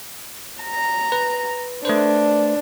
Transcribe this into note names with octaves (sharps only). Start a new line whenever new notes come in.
A#5
B4
A3 D4 B4 C5